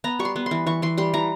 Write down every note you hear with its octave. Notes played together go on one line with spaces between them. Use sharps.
B3 A#5
G3 C#6
C6
B3
C6
E3
E3 C#6
E3 C6
G3 C6
E3 A#5